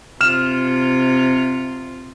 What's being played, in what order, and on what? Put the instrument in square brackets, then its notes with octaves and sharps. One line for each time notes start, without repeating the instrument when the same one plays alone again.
[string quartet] C3 F4 [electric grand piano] F6 E7